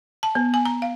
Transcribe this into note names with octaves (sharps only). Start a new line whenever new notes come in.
A5
B3
G#5
A#5
F5